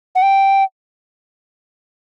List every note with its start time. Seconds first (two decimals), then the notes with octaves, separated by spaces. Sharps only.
0.15 F#5
0.22 G5